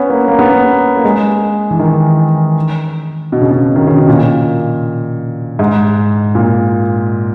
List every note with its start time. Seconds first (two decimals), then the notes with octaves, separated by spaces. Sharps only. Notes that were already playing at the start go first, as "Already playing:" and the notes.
Already playing: B3 C#4
0.10 A#3
0.28 A#3
0.39 B3
0.49 A#3
0.97 A#3
1.05 G#3
1.71 E3
1.79 D#3
3.32 B2
3.42 C#3
3.51 B2
3.76 D#3
3.87 C#3
3.97 B2
4.08 A#2
5.59 G#2
6.35 A#2